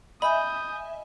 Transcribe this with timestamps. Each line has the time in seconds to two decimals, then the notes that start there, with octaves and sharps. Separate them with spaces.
0.22 D#5 E5 G#5 B5 D#6 G6